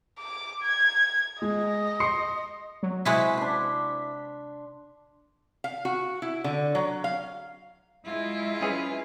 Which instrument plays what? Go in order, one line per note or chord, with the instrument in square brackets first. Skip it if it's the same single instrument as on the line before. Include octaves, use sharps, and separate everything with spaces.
[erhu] D6
G#6
[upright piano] G#3 [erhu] D#5
[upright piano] C6 C7 C#7
[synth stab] F#3
[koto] C3 G#3 B4 [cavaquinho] E4 F#4 C5 [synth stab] B6
[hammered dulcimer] D4 C6
[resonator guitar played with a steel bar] F5
F#4
E4
D3
F#3
F5
[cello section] F#3 G#3 E4 [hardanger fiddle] F4
[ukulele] C#4 G#4 B4